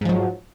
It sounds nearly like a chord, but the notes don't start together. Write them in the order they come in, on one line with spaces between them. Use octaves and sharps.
G#2 F3 F#3